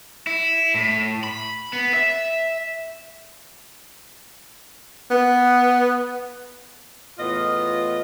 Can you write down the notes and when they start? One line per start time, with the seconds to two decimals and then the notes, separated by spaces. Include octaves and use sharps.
0.27 E4
0.75 A2
1.24 B5
1.73 B3
1.94 E5
5.11 B3
7.18 E2 A2 B3 F4 D#5